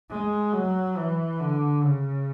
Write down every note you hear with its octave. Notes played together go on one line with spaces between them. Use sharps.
G#3
F#3
E3
D3
C#3